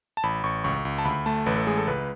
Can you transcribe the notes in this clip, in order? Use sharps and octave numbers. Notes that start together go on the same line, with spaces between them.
A5
A1 B5
A1 C#6
C#2 C#6
C#2
A5
D2 B5
A3 A5
A1 B4
A4
G#3 G#4
A4
C#2 B4